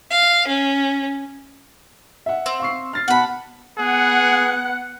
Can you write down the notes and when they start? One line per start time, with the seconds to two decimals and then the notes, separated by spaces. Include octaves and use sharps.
0.11 F5
0.48 C#4
2.26 E5 F#5
2.46 C4
2.60 F5 C#6 C7
2.93 F6 A6 C7
3.08 B2 F#5 A5 B5
3.79 B3 G#4 F#5